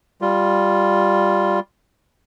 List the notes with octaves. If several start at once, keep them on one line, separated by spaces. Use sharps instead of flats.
G3 F4